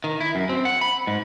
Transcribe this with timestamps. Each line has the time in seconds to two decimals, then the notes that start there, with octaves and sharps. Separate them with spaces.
0.04 D#3
0.21 E4
0.35 F#2
0.49 C4
0.65 F#5
0.81 B5
1.07 G#2